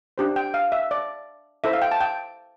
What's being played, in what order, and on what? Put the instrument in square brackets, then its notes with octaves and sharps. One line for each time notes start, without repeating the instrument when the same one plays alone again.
[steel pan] D4 G4 C5
G5
F5
E5
D5
E4 A4 C5 E5
F5
G5
A5
G5